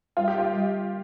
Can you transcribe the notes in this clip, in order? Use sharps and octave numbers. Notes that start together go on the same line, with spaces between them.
G3 F4
G4
F4
G3